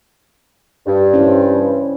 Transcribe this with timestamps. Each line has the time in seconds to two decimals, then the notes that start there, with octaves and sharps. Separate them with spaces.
0.87 G2
1.14 C#4 E4 C5